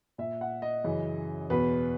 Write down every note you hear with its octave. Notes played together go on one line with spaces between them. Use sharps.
A#2 E5
F#5
D#5
F#2 C#3 E3
E2 B2 B4